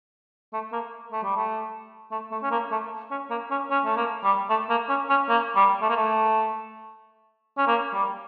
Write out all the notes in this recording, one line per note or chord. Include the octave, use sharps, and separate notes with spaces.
A3
A#3
A3
G3
A3
A3
A3
C#4
A#3
A3
C#4
A#3
C#4
C#4
A3
A#3
G3
A3
A#3
C#4
C#4
A#3
G3
A3
A#3
A3
C#4
A#3
G3